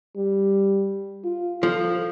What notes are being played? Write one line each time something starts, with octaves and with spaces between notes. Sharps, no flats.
G3
F4
F3 A4